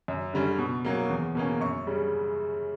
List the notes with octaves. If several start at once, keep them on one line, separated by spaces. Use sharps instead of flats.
F#2
D3 G3 C#4
B2
F#3 A#3 C#4
E2
B2 A#3 C#4
F#2 C#6
C#3 G3